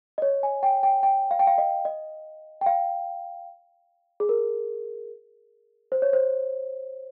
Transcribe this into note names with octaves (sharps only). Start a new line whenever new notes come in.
D#5
C#5
G#5
G5
G5
G5
F5
G5
F5
D#5
D#5
G5
F5
G#4
A#4
C5
C#5
C5